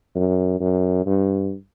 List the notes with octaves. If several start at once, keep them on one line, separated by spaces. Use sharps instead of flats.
F#2
F#2
G2